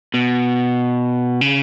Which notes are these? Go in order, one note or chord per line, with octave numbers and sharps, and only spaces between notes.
B2
C#3